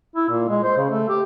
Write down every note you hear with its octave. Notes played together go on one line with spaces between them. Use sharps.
E4
A#2
G#3
C5
C#3
A3
G4